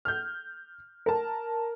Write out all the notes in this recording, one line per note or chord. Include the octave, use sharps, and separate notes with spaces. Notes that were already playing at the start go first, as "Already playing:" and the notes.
F6 G6
A#4 A5